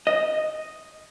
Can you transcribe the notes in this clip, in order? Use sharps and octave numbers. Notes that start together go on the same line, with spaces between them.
D#5